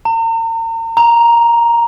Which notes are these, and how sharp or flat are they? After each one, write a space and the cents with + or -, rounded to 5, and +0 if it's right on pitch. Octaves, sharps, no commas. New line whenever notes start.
A#5 -40
A#5 +5